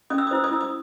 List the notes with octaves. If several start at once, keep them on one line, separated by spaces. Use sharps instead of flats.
C#4 D#6
E6
D#6
E4 C5 E6
D#6
E4 E6
D#6